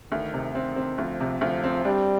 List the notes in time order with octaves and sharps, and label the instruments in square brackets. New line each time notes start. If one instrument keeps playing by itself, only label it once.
[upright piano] D2 [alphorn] D#3
[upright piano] C3
[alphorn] D#3 [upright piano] C4
[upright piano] C4
[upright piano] D2 [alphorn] F3
[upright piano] C3
[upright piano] D2 [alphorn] F3
[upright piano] C4
[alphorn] G3 [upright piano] D4